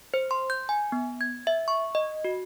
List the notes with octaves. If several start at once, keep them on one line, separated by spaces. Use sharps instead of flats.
C5
C6
G6
G#5
B3
G#6
E5
C#6
D#5
F#4